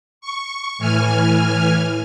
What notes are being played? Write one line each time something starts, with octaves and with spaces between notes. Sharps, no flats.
C#6
A2 E3 G#5 F6